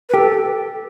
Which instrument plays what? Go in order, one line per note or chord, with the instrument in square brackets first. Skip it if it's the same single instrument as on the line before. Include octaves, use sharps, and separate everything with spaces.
[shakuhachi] B4
[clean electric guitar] G4 [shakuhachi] A4